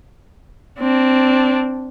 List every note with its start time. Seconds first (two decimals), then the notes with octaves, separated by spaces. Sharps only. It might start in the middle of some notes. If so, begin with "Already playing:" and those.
0.80 C4 D4